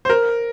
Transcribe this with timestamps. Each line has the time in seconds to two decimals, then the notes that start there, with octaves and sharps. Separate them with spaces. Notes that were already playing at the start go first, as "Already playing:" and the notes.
0.05 C5
0.10 A#4